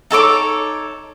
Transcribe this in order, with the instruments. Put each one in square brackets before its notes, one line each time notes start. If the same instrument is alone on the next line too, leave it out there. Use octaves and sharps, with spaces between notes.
[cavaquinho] D#4 A4 C#5 D6